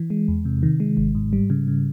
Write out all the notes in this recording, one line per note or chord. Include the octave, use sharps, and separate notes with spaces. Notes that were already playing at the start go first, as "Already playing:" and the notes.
Already playing: E3
G#3
E2
C3
D#3
G#3
G#1
G#2
G3
C#3
C#3